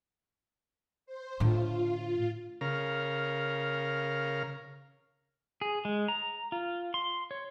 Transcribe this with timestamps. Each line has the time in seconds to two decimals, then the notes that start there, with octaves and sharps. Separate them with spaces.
1.06 C5
1.40 A2 D3 F4
2.61 C#3 A#4 F5
5.61 G#4
5.85 G#3
6.08 A#5
6.52 F4
6.94 C6
7.31 C#5